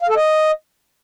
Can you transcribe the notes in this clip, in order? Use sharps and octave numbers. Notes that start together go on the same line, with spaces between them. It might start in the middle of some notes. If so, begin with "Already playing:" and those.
F5
A4
D#5